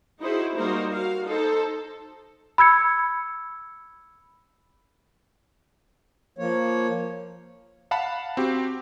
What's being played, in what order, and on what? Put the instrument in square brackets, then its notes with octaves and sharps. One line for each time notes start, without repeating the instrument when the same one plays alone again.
[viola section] D#4 E4 F#4 G#4 C5
G3 A#3 D#4 F#4 A#4 C5
F#4 F5
D#4 A4 C5
[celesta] B5 E6 G#6 C#7
[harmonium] F3 A#3 C#5
[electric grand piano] F5 F#5 A5 B5
C4 F#4 G4